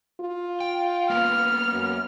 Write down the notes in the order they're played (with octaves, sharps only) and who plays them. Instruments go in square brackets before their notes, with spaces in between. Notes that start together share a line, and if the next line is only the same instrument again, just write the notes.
[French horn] F4
[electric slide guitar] G5
[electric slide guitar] A#3 B3 C#4 [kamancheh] F6
[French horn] F#2